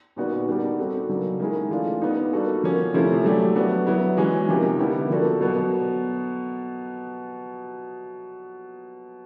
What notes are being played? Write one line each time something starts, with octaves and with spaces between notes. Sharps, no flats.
A#2 G3 B3 D#4 F#4
D#3 G3 B3 D4 G4
G3 C4 D#4 F#4 A4
C#3 F#3 A#3 D4
D#3 G#3 C#4 E4 G#4
E3 A3 D4 F4
G3 B3 D#4
G3 A#3 D4 F#4 A4
F3 A#3 C#4
C3 F3 A3 C#4 E4
F#3 A3 D4 G4
F#3 B3 D4 F#4
F#3 B3 E4
E3 G#3 C#4 F#4
C3 F3 A#3 D#4 G4
D3 G3 B3 E4 G4
F3 A#3 D4 F#4 A4
B2 F#3 B3